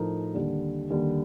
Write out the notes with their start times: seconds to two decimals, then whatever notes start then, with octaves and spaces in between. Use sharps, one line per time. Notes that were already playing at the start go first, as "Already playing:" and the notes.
Already playing: A2 F3 A3 D#4 A#4
0.34 D#2 D3 G3
0.90 D#2 D3 G3